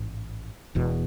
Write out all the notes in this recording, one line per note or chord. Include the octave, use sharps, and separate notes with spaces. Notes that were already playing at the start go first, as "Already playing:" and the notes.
Already playing: A1 G#2
E1 E2 B2